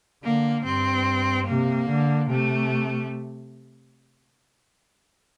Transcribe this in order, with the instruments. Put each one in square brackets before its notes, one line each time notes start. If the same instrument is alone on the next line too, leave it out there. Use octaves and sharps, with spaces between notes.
[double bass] D3 [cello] A#3
[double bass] G2 [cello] C4
[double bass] C3 [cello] A#3
[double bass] D3
[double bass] C3 [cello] A3